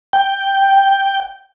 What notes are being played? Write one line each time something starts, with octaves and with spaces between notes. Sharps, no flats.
G5